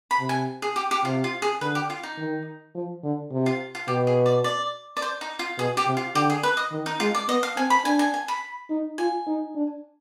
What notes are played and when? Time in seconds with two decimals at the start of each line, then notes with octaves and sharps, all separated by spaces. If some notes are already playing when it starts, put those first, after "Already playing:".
0.11 B5
0.20 C3
0.29 G#5
0.62 G#4
0.76 G4
0.91 G4
1.05 C3 F4
1.24 F4
1.42 G#4
1.61 D3 B4
1.75 G4
1.90 F4
2.03 D#4
2.18 D#3
2.75 F3
3.03 D3
3.32 C3
3.46 F4
3.75 F4
3.88 B2 G4
4.07 G#4
4.26 D5
4.44 D5
4.97 D5
5.02 C5
5.21 D#4
5.39 F4
5.58 B2 G#4
5.77 G4
5.87 C3
5.97 F4
6.15 D3 G4
6.30 G#4
6.43 B4
6.57 D#5
6.72 D#3
6.86 D#4
7.00 G#3 F4
7.15 D5
7.28 B3 D#5
7.43 F5
7.57 C4 G#5
7.70 B5
7.85 D4 G#5
7.99 G#5
8.14 G#5
8.28 B5
8.70 D#4
8.98 F4 G#5
9.27 D#4
9.55 D4